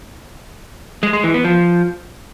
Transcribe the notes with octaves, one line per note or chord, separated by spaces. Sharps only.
G#3
G#3
E3
B3
F3